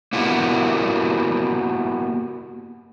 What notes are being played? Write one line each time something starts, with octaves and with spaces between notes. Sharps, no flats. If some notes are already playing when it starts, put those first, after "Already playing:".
A#3 B3 E4 F#4 G4 A#4